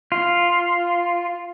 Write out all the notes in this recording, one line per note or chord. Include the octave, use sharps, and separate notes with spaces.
F4